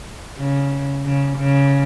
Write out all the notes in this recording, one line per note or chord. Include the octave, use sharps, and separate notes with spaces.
C#3
C#3
C#3